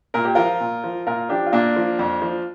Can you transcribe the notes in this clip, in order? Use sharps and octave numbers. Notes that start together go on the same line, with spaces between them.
A#2 A#4
G4
F3 F4 A#4
A#2
F3
A#2 F4 A#4
F3 D4 G4
F4
A#2 A#3 D4
F3
F2
F3